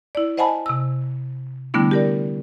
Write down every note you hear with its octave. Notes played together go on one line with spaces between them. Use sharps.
E4 D5
C5 D#5 F#5 G#5 A5 B5
C3 E6
D3 G3 A3 B3 D4 E4
G4 A#4 D5